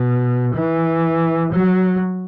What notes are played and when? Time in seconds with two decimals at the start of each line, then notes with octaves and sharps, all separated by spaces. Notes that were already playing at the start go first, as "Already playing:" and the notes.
Already playing: B2
0.54 E3
1.52 F#3